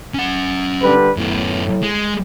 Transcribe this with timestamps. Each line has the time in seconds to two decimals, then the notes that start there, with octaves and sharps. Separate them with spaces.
0.14 C#4 F#5
0.82 D3 G3 B4
1.17 F#2 A2 B3
1.83 G#3